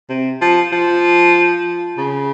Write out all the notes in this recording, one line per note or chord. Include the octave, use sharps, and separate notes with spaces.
C3
F3
F3
C#3